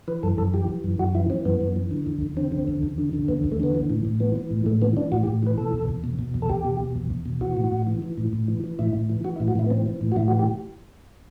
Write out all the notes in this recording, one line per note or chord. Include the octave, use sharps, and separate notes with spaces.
E3 B4
F#2 A4
F#2 A4
E3 G4
E3
F#2
F#2 F#4
E3 E4
E3 C4
F#2 B3
F#2
E3
D3
E2
E2
D3 C4
D3
E2
E2
D3
D3
E2 B3
E2
A3
D3 B3
E3
A2
A2
E3 B3
E3
A2
A2 A3
E3 B3
E3 D4
A2 F#4
G4
A2
E3 B4
B2 A4
E2
E2
B2
B2
E2
A4
E2 G4
B2
B2
E2
E2
B2
E3 F#4
A2
A2
E3
E3
A2
A2
E3
E3
A2 E4
A2
E3
E3 F#4
E4
A2
F#4
A2 E4
B3
E3 C4
E3
A2
F#4
A2 E4
F#4
E3
G4